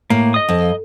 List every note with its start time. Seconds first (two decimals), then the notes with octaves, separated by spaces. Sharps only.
0.10 A2 A#3
0.34 D#5 D#6
0.49 F2